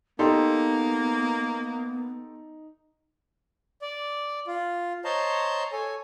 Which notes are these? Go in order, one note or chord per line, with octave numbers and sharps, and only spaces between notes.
A#3 B3 D#4 G4 A4 C6
D5
F4
C5 C#5 D#5 A5 A#5 C6
A4 C#5 G#5